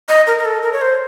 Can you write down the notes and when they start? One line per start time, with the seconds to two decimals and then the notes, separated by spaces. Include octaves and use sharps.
0.09 D#5
0.27 A#4
0.39 A#4
0.45 A4
0.63 A#4
0.73 C#5
0.81 C5